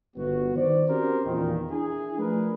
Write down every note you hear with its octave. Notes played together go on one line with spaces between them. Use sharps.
G1 B3 F#4
D#3 C5 D5
C4 C#4 F#4 G4 A#4 C5
E2 A#2 D#3
D4 E4 G#4
F3 A3 D4 G#4 A#4 B4